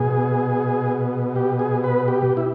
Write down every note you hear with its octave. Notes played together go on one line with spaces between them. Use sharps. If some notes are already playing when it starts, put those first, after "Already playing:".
Already playing: B2 G#4
G4
G#4
B4
G4
E4